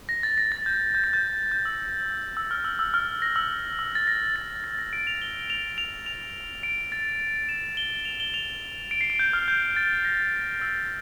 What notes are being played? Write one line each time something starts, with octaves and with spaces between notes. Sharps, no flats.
A#6
A6
A#6
A6
G6
G6
A6
G6
G6
E6
E6
F6
E6
E6
F6
A#6
E6
E6
A6
A#6
A6
A6
A#6
D7
F7
G7
F7
F7
F7
D7
A6
E7
G7
F7
G7
F7
D7
C7
D7
G6
F6
G6
A6
A#6
E6